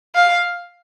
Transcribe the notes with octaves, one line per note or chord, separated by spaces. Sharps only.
F5